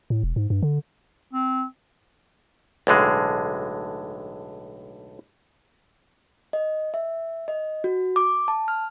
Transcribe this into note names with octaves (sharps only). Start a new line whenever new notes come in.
A2
E1
G#2
G2
D3
C4
B1 A2 D3 G#3
D#5
E5
D#5
F#4
D6
A5
F6